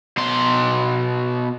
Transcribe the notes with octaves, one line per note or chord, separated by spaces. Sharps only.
B2 C6